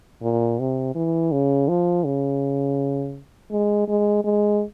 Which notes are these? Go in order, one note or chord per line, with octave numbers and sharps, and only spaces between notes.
A#2
C3
E3
C#3
F3
C#3
G#3
G#3
G#3